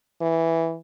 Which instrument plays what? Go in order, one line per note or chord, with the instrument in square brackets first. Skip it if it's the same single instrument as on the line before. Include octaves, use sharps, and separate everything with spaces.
[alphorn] E3